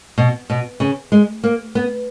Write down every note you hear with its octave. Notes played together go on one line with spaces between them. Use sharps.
B2
B2
C#3
G#3
A#3
B3